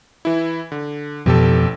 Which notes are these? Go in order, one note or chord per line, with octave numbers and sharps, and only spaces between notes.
E3 E4
D3
A1 F2 B2 G4 A4